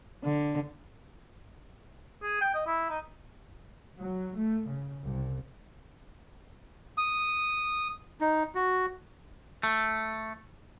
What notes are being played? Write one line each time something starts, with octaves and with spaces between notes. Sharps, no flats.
D3
G#4
G5
D#5
E4
D#4
F#3
A3
C#3
C2
D#6
D#4
F#4
A3